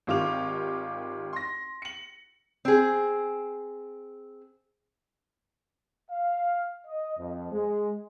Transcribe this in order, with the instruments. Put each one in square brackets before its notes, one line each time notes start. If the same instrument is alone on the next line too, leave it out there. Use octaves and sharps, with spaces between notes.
[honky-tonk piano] G#1 D#3 F4 G4 D6 F7
C6 A#6
C#7 F#7
[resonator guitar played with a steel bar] C4 G#4
[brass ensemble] F5
D#5
F2
G#3